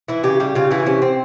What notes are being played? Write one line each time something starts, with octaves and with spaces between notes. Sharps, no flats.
E3 E4
C#3 G4
G3 G4
C#3 F4
E3 E4
C3 C#4
C4